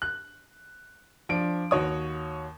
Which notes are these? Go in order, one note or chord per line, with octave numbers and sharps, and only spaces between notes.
F#6
F3 D4 D7
D#2 F#4 C#5 D#6